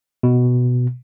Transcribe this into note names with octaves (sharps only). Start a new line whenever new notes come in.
B2